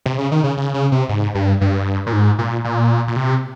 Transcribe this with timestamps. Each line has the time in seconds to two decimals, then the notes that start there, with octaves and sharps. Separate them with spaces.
0.06 C3
0.18 C#3
0.32 D#3
0.44 C#3
0.57 C#3
0.74 C#3
0.92 C3
1.09 G#2
1.35 G2
1.61 G2
2.06 A#2
2.13 G#2
2.39 A#2
2.64 A#2
3.08 A#2
3.16 C3